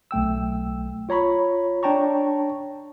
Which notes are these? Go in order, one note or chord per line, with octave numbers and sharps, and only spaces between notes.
B1 A3 G5 E6
F4 C#5 A#5 B5 C#6
D4 C#5 G5 A5 A#5 C#6